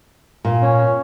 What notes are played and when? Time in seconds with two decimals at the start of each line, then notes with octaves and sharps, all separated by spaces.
0.45 A#2
0.62 C#4